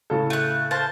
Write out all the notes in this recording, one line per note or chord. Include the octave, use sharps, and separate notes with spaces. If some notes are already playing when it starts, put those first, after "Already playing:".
A2 C#3 A4
A3 F#6
A#3 C5 A5